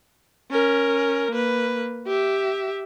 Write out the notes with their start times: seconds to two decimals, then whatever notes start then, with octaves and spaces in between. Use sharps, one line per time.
0.51 C#4 A#4
1.31 A#3 B4
2.07 G4 E5